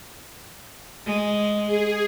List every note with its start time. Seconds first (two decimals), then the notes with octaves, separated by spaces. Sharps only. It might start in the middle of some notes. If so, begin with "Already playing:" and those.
1.06 G#3
1.65 G#4